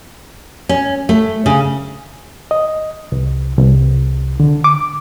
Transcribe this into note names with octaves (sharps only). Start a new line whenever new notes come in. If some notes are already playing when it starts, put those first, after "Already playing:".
C#4
A3
C#3
D#5
C2
C2
D3
D6